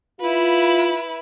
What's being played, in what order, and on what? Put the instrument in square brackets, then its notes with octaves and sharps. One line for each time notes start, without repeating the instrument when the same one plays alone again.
[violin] E4 B4 [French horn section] F4